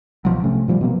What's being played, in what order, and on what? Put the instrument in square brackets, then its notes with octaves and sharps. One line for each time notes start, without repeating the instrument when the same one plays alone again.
[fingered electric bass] C2 B2 F3 F#3
C3 A3 C#4
A#2 F3 G3
B2 F#3 A#3